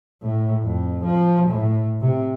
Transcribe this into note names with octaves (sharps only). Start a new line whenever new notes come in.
A2
F2
F3
A2
C3